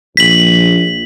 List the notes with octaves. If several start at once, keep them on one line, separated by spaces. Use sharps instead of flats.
A#1 B6 F#7